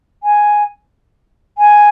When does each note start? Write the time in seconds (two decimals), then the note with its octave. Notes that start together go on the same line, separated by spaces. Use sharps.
0.23 G#5
1.58 G#5